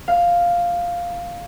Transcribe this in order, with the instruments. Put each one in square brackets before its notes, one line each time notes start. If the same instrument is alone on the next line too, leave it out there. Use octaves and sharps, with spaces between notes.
[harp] F5